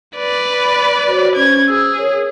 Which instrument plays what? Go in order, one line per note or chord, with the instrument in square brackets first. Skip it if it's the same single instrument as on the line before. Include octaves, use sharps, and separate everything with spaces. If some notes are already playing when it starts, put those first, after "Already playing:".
[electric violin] B4 D5
[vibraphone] B5
F#4 C5 C#5
[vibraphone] C#4 C5 [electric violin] G#6
[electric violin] G#4 [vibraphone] E6
[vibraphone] A#4 C#5